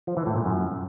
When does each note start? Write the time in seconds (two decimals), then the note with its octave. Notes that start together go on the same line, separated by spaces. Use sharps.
0.07 F3
0.17 E3
0.26 A2
0.36 A#2
0.45 F#2